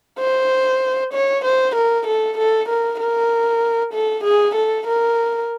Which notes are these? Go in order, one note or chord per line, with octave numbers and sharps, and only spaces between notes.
C5
C#5
C5
A#4
A4
A4
A#4
A#4
A4
G#4
A4
A#4